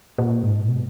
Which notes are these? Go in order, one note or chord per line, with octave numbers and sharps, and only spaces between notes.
A#2
G#2
B2